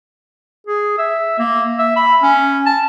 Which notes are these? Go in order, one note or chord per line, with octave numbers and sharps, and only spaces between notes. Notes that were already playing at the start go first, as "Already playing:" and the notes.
G#4
E5
A#3
E5
B5
C#4
A5